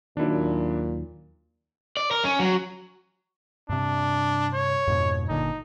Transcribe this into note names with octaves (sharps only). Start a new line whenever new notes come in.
D#2 A#2 D#3 F#3 D4 E4
D5
A#4
C#4
F#3
G2 C3 D4
C#5
F2 G#2 B2
G1 A#2 D3 D#4